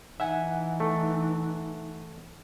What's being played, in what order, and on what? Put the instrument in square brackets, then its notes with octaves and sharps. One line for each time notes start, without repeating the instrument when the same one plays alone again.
[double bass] E3 [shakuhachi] D#4 [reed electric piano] E5 F#5 G#5
[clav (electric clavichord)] A3